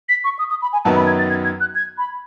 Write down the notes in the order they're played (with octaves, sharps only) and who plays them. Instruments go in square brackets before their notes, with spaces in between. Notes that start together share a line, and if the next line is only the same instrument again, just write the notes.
[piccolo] B6
C#6
D#6
D#6
B5
G#5
[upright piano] F#2 D#3 F#3 B3 [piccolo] A5
[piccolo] B5
G#6
A6
G#6
G#6
F#6
G#6
B5